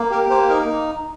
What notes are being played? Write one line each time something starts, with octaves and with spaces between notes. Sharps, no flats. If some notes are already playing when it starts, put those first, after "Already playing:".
Already playing: A#3
G4 A#4
A#3 C5
D#4 A#4